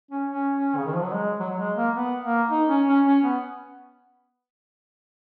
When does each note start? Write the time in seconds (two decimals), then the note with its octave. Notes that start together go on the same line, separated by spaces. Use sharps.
0.11 C#4
0.30 C#4
0.57 C#4
0.77 C#3
0.86 D#3
0.94 F3
1.03 F#3
1.13 G#3
1.40 F#3
1.50 F#3
1.58 G#3
1.76 A#3
1.95 B3
2.23 A#3
2.50 D#4
2.68 C#4
2.87 C#4
3.06 C#4
3.24 B3